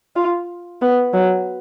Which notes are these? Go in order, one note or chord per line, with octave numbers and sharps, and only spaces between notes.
F4
B3
F#3